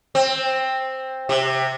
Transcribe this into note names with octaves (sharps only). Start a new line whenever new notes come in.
C4
C3